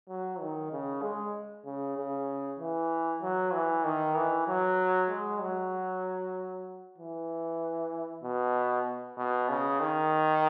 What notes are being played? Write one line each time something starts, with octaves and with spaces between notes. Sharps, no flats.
F#3
D#3
C#3
G#3
C#3
C#3
E3
F#3
E3
D#3
E3
F#3
G#3
F#3
E3
B2
B2
C#3
D#3